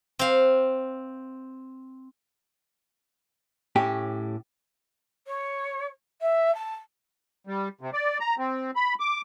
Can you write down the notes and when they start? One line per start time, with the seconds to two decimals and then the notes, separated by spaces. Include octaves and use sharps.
0.19 C4 F5
3.76 A2 C#4 G4
5.27 C#5
6.21 E5
6.55 A5
7.47 G3
7.81 C3
7.93 D5
8.20 A#5
8.38 C4
8.76 B5
9.00 D6